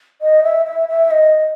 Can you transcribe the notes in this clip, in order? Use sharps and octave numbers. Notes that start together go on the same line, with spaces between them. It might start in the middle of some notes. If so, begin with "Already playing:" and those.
D#5
E5
E5
E5
D#5